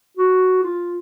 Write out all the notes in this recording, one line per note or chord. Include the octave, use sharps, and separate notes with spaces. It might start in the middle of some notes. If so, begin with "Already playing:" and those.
F#4
F4